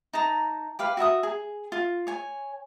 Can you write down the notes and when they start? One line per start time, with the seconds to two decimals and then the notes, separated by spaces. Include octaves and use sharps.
0.13 D#4 A5 A#5
0.79 G4 B4 F5
0.97 F#4 E5 A#5 D#6
1.23 G#4
1.72 F4
2.07 C#5 G#5